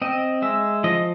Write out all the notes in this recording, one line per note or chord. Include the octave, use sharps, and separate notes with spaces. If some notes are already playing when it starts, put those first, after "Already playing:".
C4 D#5
G#3 E5
F3 D#5